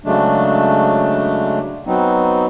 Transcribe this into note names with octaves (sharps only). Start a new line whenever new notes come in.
C#3 F#3 G#3 A3 D4
F#3 B3 C4 D#4